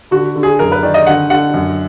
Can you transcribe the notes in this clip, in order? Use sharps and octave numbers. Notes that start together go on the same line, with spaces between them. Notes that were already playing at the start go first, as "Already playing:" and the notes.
D3 F#4
D3
G#4
F#2 A#4
B4
D#3 D5
D#5
D3 F#5
D3 F#5
F#2